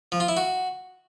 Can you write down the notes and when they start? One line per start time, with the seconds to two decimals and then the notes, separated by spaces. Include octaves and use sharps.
0.12 F3
0.20 F4
0.29 E4
0.37 F#4